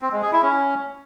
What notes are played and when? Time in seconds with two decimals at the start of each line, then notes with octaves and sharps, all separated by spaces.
0.02 C4
0.12 G#3
0.22 G#4
0.32 E4
0.42 C#4